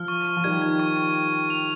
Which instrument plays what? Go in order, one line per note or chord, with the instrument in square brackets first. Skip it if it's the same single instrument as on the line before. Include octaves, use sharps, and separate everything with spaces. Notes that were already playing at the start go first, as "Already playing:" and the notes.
Already playing: [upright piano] F3 [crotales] F6
[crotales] C#6
C#6
[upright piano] F3
[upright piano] D#3 G3 [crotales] G#6
[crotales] G#6
C#6
C#6
C#6
C#6
F7